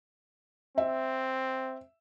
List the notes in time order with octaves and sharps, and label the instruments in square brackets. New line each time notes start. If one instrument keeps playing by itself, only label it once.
[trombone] C4 [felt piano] E5